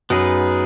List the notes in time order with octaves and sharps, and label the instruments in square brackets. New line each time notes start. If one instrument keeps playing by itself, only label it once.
[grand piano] F#2 [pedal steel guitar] B3 D#4 G#4 B4